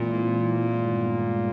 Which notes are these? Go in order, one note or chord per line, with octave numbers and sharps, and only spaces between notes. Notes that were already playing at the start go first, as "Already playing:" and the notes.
Already playing: A#2 E3 G#3 C4 E4
G2 D#3 G#3 B3